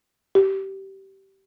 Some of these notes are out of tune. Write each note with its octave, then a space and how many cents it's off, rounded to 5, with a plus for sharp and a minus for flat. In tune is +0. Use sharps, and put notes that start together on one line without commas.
G4 -20